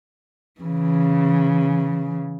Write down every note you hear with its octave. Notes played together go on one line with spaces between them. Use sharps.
C#3 E3